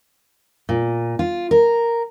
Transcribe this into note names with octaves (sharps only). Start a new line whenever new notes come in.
A#2
F4
A#4